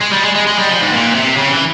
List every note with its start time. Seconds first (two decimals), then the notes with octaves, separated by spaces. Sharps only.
0.01 G#3
0.13 G3
0.24 G#3
0.35 G#3
0.47 G#3
0.58 G3
0.69 F3
0.81 G#2
0.91 A#2
1.14 C3
1.37 C#3
1.50 E3